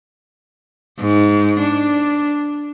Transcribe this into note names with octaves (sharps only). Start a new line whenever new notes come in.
G#2
D4